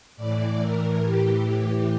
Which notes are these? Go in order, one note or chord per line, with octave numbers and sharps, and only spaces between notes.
A2 E3 D5
A2 E3 A#4
A2 E3 G4
A2 E3 G4